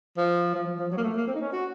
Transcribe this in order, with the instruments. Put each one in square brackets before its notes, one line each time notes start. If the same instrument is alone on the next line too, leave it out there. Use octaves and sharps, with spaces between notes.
[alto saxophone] F3
F3
F3
F3
F#3
A#3
A3
A#3
C4
D#4
C#4
F#4